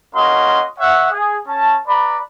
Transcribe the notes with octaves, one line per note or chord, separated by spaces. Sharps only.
A#3 C#4 F#4 D#5 C6
C#5 E5 F#5
G#4
C#4 A5
B4 D5 A#5 B5